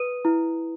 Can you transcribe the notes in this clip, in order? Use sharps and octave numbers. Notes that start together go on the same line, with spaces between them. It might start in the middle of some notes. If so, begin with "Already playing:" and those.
Already playing: B4 D#6 D#7
E4